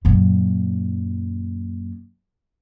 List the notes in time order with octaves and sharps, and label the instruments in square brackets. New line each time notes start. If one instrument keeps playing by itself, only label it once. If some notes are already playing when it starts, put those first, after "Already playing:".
[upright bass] F#2 A#2